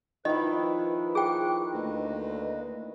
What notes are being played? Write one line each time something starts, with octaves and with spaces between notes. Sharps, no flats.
D#3 F3 E4 B4 D#5
G#4 G5 F#6
D2 A#3 B4 D#5